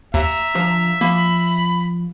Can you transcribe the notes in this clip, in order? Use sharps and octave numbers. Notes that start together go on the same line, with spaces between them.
D#2 E5 A#5
D3 F3 C5
F3 A#3 B5